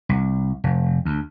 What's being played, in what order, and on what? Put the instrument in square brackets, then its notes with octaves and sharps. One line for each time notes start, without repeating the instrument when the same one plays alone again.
[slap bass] C2
F1
D2